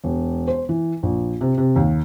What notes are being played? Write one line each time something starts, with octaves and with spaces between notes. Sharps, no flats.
E1
C5
E3
A#1
C3
C3
D#2